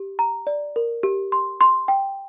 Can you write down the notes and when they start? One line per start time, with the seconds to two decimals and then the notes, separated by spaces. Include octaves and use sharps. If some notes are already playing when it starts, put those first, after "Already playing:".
Already playing: G4
0.19 A#5
0.47 D5
0.76 A#4
1.03 G4
1.32 C6
1.61 C6
1.88 G5